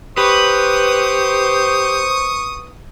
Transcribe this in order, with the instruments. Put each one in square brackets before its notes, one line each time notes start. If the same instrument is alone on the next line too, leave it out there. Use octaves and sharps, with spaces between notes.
[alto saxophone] G4 [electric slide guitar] B4 [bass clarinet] C5 [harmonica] C#6 D#6